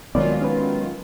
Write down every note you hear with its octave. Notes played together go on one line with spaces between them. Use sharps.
D#3 F#3 G#3 A3 B3 F4 C#5 D5
C#4 B4